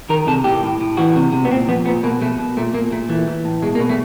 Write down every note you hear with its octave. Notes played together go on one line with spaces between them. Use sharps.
D#3 A#4
C3 A4
A2 G4
A2
A2
E3 F#4
C3
C3
B3
A#2 C4
F3 B3
A#2 B3
B2 A#3
B2 A3
B2
A#2 A3
A#2 A#3
A#2 A3
E3 A3
E3
A2
B2 G#3
A#3
B2
A3